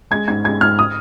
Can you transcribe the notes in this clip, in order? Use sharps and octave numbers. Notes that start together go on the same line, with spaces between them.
G#3 G#6
G#2 G#6
G#3 G#6
G#2 F6
D#6